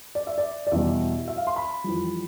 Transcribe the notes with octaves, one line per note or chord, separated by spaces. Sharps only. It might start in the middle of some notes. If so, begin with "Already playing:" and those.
D5
E5
D5
D5
E2 B2 G3 E5
E5
F5
C6
B5
F2 E3 G3